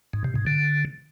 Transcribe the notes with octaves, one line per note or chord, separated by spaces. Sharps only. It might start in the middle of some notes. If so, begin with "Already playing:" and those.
G#2
C3
G#2
D3